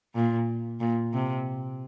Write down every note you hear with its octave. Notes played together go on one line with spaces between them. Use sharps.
A#2
A#2
C3